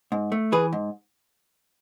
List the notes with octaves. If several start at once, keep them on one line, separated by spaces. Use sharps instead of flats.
G#2
A3
E3 G#4 B4
G#2